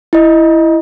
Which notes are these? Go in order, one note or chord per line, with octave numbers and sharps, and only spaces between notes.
E4 D#5